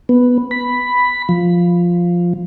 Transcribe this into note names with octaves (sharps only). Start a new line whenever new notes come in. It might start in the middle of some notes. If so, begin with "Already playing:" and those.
B3
B5
F3